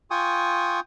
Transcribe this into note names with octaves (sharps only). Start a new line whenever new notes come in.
F4 G5 G#5 C#6 D#6